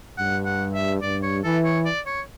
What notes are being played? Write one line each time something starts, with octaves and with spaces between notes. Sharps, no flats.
G2 F#5
F#5
E5
G2 D5
C#5
E3 A4
C#5
D5
C#5